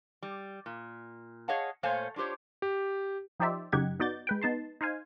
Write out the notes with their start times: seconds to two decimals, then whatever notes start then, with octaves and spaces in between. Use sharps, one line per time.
0.22 G3
0.66 A#2
1.48 G#4 C#5 D#5 F5 F#5 A5
1.83 A#2 A3 C5 C#5 F5 G#5
2.16 D4 F4 G4 C5 C#5
2.62 G4
3.40 F3 D#4 G4 C5 D5 E5
3.72 F#2 C#3 D#4 G4 F#5 G#6
4.00 B3 D#4 F#4 D5 G6 A6
4.27 G#3 B4 G5
4.41 B3 D#4 A5 C6
4.81 D#4 C5 F5 G#5